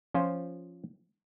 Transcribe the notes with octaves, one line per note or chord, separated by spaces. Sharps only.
F3 C#4 F4 C5